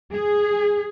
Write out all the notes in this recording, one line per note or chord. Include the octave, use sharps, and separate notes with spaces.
G#4